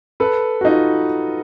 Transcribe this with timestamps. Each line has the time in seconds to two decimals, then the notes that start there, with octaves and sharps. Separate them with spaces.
0.20 A4 B4
0.61 F#4
0.65 D#4 F4